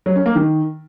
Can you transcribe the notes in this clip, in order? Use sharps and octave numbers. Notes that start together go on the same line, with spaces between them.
F#3
C#4
A#3
D#3